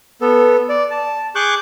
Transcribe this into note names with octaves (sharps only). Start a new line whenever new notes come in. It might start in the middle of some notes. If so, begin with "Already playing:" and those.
B3 A4
D5
A5
G#4 C#6 D6 F#6 G6